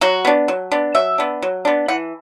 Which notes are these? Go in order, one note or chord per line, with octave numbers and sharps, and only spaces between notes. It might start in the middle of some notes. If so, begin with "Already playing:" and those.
F#3 F#4
B3 D4
F#3
B3 D4
F#3 E5
B3 D4
F#3
B3 D4
E3 F#5